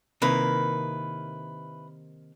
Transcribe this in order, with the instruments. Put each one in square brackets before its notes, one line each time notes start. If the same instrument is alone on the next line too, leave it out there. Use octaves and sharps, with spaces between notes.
[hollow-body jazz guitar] C3 D#3 A#3 [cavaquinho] E4 B4